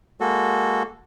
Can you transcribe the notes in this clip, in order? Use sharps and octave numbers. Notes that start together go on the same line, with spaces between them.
G#3 A#3 F#4 A4